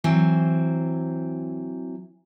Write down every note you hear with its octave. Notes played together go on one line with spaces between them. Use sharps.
E3 F#3 C4